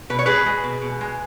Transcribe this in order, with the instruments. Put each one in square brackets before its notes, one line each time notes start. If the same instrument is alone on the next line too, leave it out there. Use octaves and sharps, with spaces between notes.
[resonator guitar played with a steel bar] B2 B4
C#5
G#3 G#4 B4
G#3
B2
B2
G#3